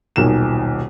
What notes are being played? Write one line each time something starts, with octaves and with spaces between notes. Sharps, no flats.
D#1 B1 D#3 E7